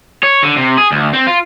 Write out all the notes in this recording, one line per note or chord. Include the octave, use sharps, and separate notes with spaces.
C#5
D3
C3
G#4
D2
C4
F4